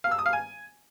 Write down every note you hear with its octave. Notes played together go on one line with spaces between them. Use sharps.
F5
E6
D#6
F5
G#5